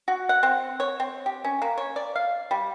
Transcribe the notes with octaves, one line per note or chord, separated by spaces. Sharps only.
F#4
F#5
C4
C#5
C4
G4
C#4
A#3
C#5
D5
F5
G3